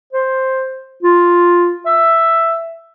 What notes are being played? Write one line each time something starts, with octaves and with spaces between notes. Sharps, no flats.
C5
F4
E5